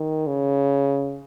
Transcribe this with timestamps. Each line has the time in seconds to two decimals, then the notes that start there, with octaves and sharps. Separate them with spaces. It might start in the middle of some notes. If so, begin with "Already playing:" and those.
Already playing: D#3
0.27 C#3